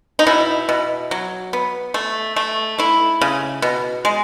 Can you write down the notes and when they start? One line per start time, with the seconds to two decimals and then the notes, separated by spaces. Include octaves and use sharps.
0.19 D#4
0.27 B2 E4
0.69 B2
1.11 F#3
1.53 B3
1.94 A3
2.36 A3
2.78 A3 E4
3.21 C#3
3.62 B2
4.05 G#3